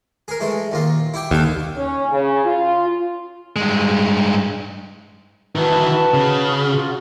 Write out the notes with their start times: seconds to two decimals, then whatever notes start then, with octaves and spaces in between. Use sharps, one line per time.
0.28 G#4 A#4
0.40 E3 G#3 A3
0.71 D#2 A#2 F4
1.14 E4 G4 G5
1.31 D#2 B3 A4
1.76 C#4
2.11 C#3
2.45 F4
3.56 G2 G#3
5.55 D#3 E3 F#4 B4 A5
6.14 C#3
6.71 F4 F#4